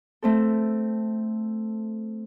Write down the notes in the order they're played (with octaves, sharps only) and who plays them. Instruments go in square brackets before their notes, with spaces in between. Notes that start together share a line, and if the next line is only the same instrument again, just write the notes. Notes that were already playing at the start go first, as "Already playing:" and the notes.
[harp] A3 C4 A4